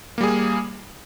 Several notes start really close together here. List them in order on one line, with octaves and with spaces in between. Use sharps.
A#3 G3 G#4